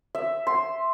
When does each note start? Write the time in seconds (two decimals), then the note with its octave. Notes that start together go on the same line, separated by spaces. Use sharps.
0.15 E5
0.47 C6